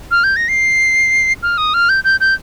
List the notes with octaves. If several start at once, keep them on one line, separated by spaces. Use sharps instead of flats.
F6
G6
A#6
C7
F6
D#6
F6
G6
G6
G6